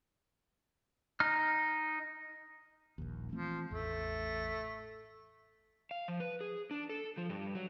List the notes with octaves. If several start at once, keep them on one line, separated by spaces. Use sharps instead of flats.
D#4 F6
D#1 A#1 D#2
E3 F3 A3 C4
A1 E2 A3
F5
F3
B4
G#4
D4
A4
F3
G2
F#3